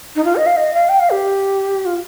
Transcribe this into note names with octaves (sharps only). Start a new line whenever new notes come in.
D#4
F4
D#5
F5
D#5
F5
G5
F5
G4
F4